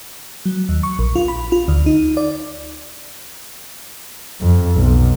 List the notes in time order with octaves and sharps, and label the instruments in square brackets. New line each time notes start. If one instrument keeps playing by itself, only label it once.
[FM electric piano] F#3
D#2
C#6
A#1
F4
B5
F4
D2
D#4
D5
[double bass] F2
B1